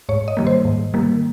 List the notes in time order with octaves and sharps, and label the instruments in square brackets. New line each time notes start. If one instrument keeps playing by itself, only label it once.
[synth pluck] G#2 C#5
D#5
D#3 G3 A#3
C5
G#2
D#3 G3 A#3